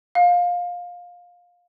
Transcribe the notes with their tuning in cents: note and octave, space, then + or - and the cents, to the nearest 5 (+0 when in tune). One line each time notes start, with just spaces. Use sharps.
F5 +20